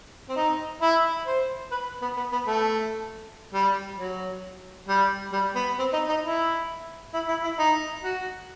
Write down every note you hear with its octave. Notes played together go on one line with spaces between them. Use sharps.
C4
D#4
E4
C5
B4
B3
B3
B3
A3
G3
F#3
G3
G3
B3
C4
D#4
D#4
E4
E4
E4
E4
D#4
F#4